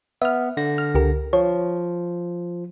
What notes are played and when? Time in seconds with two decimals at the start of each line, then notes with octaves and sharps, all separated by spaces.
0.22 B3 E5 F6
0.57 D3 A#6
0.78 F6
0.95 C#2 G4 A#4
1.33 F3 C#5